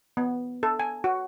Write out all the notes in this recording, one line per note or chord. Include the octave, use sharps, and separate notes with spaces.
B3
A4
G#5
F#4